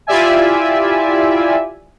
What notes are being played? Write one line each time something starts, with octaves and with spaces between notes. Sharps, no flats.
E4 F4 G4 D5 E5 G#5